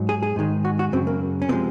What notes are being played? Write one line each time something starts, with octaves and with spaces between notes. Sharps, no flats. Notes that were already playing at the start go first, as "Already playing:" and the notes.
Already playing: G#2 F#3
G#4
G#4
G#2 D#3 G#3
F#4
F#4
F#2 C#3 F#3 C4
A#3
C#4
C3 F3 G#3 C4